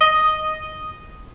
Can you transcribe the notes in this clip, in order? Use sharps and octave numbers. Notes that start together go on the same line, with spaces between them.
D#5